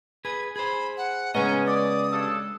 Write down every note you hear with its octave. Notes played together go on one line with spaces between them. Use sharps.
G#4 B4 G#6
G#4 C5 B5
F#5
C#3 G#3 B3 C#4 D#5 A#5
D5 D#6
G2 A4